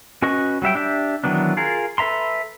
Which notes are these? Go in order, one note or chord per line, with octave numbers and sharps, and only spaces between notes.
C#4 F#4 B4 D#5 C#6
F#3 G3 E5 G5
D4 G4 E5
D#3 E3 F#3 B3 D4
F4 G#4 A#4
A4 B4 E5 A#5 C6